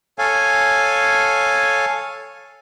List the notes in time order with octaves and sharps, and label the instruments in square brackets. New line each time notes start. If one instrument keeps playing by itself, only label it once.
[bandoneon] A4 C#5 F5 G#5